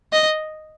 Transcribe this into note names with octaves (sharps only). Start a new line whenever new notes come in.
D#5